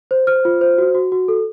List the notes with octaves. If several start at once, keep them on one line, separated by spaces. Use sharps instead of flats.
C5
C5 F6
F4
C5
F#4
F#4
F#4
A4